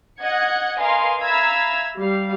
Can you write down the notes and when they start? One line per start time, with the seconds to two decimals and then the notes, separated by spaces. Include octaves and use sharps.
0.21 D#5 F#5 F#6 G#6 C#7
0.79 A#4 B4 D#5 F5 G#5 C6
1.23 E5 F5 A#5 B5 E6 G#6
1.98 G3 F5